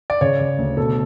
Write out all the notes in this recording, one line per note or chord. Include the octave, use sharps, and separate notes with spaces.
D5
C#3 C#5
C#3
D2
B2 A4